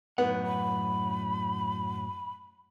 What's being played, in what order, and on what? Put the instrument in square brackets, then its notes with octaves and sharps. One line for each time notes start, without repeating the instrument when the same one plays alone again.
[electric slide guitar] F#2 A2 F#5 [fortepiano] B3
[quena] B5